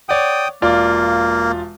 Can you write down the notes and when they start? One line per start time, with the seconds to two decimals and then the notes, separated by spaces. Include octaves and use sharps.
0.09 C#5 D5 F#5 G5 D#6
0.62 E1 A#3 F4 D5